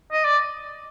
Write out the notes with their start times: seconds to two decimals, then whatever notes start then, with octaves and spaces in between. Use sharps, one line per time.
0.12 D#5
0.25 D5